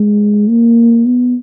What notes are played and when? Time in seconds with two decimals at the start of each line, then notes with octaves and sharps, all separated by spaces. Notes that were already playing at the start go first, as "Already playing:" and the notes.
Already playing: G#3
0.49 A#3
1.06 B3